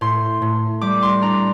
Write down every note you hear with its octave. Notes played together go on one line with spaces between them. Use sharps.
A2 C6
A2
G3 D6
C6
D4 A#5